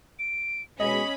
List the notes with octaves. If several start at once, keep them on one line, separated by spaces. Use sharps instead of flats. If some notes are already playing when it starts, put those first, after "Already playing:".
D7
B2 G#3 C#4 G#4 D#5 B5 F#7